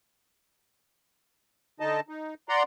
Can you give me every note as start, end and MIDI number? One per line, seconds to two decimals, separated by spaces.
1.80 2.00 50
1.80 2.00 63
1.80 2.00 75
1.80 2.00 81
2.09 2.34 63
2.49 2.63 74
2.49 2.63 78
2.49 2.63 82
2.49 2.63 84